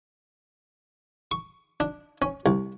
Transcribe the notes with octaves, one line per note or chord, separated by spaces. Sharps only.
C#6
D4
C#4
C2